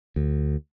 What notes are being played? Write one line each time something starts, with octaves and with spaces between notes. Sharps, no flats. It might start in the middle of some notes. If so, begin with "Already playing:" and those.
D2